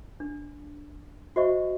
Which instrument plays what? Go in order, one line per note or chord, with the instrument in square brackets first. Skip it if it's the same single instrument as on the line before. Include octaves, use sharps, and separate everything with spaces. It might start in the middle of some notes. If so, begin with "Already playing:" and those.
[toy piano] D4
F#4 C5 D#5 E5 C#6